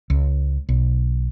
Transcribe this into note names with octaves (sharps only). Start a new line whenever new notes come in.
C#2
B1